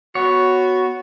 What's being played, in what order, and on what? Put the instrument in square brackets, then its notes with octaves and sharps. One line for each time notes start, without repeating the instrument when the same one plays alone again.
[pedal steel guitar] B3 C#5 [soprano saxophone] F#4